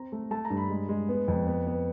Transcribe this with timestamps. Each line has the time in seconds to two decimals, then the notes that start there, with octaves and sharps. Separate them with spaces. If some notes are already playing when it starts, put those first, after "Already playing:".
Already playing: C4 A#5
0.12 A3
0.31 A3 A5
0.45 A#5
0.50 G2
0.57 B5
0.70 G#3
0.89 G#3
1.09 B3
1.28 F2
1.47 B3
1.67 B3